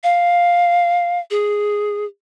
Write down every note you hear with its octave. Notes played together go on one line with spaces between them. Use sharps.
F5
G#4